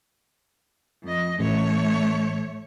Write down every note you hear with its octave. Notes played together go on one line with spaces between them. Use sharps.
F2 D#5
A1 A3 C#5